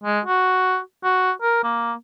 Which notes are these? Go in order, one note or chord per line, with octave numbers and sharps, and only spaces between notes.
G#3
F#4
F#4
A#4
A#3